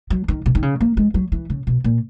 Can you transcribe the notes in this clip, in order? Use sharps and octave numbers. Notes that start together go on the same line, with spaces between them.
F#3
D#3
B2
D#3
C#3
A#3
G#3
F#3
E3
C#3
B2
A#2